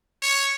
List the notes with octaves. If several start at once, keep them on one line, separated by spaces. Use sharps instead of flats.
C#5